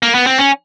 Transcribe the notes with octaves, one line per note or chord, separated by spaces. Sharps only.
A#3
B3
C4
C#4